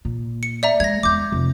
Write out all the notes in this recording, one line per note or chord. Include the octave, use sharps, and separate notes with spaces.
A#2
C#7
D5 E5 A#5
G#3 G#6 A#6
E2 G#3 D6 G6
F1